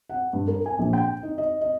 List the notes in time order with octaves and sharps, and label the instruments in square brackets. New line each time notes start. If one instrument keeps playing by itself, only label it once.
[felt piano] F#5
G2
A#4
G#5
A#1
G5
D#4
D#5
D#5